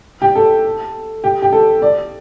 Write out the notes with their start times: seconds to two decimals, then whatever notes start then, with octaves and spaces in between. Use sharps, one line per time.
0.22 G4
0.35 A4
1.24 G4
1.42 G4
1.53 A4
1.82 D5